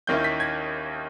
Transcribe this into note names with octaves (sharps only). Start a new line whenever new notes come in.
D#2 D#3 A#3 C#4 E4 G6
B6
G#6